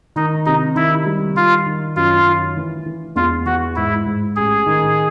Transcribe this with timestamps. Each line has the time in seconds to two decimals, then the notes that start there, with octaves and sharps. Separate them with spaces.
0.16 D#3 D#4
0.46 C3 D#4
0.76 D#3 E4
1.06 G3
1.36 D#3 F4
1.66 D#3
1.96 F#2 F4
2.27 D#3
2.57 E3
2.86 E3
3.16 E2 F4
3.46 E3 F#4
3.76 G#2 E4
4.06 G#2
4.36 A1 G#4
4.66 D#3